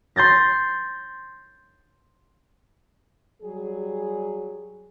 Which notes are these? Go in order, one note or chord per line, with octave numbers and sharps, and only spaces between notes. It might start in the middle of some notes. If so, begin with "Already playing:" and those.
C6 G6 A6 A#6
F#3 G3 G4 G#4